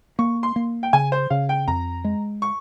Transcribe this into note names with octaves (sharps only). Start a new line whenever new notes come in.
A#3 C#6
C6
A#3
G5
C#3 G#5
C5
C#3 F5
G5
F2 A#5
G#3
C#6